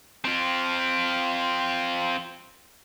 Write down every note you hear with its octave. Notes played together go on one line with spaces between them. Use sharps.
C4 F4